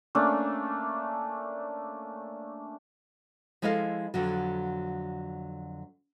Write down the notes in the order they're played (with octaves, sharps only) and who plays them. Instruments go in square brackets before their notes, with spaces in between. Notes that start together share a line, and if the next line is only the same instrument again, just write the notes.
[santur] A3 A#3 C#4 D4
[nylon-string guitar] F3 G#3 E4 A4 D#5 F5
F2 D3 F#3